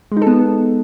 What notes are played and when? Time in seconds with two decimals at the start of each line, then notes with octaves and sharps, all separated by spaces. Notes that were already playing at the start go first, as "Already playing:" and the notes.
0.12 G#3
0.17 D#4
0.22 A4
0.27 B3